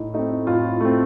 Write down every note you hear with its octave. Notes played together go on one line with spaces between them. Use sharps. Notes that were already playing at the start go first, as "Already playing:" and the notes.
Already playing: A2 D#4
A3 C4 D#4
A2 F4
A3 C4